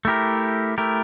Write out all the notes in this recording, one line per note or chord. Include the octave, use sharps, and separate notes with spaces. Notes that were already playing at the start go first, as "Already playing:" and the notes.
A3 E4 G4 A#4
A3 E4 G4 A#4